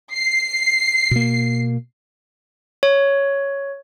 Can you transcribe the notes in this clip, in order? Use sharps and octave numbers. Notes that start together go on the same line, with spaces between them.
C7
B2 A#3
C#5